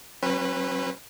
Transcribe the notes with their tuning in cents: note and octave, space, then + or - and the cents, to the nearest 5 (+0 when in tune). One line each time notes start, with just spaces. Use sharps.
F#3 +0 C#4 -45 B4 +0